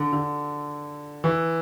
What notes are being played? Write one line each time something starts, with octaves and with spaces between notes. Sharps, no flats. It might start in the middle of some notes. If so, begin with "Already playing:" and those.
Already playing: D3
D3
E3